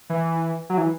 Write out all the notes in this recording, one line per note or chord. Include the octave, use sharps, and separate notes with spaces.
E3
F#3
E3